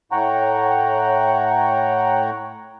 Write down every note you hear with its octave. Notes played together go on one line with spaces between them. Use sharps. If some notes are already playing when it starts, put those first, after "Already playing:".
A2 C#5 F#5 G5 A#5